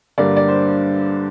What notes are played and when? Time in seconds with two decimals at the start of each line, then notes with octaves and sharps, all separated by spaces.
0.18 G2 D3 G3 A#3 D5
0.37 D5
0.48 C5